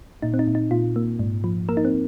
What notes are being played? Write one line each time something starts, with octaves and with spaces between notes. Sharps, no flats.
A#2 D#4
C4
D#4
A#2
D#4
A#2 F4
A#3
G#2
F3
A#3 A#4
D#4
C4